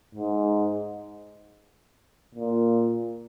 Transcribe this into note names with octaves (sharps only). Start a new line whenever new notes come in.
G#2
A#2